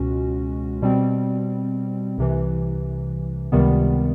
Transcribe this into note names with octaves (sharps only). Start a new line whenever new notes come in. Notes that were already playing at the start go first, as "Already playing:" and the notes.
Already playing: C#2 B2 G#3 C#4 F#4
B2 G3 C4
C2 C3 E3
C#2 C3 D#3 G3 B3